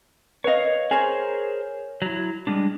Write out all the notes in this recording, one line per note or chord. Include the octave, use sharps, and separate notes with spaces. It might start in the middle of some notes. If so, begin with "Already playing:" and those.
B4 C#5 D#5 F5
G#4 A#4 C5 C#5 G#5
F#3 E4
G3 G#3 D4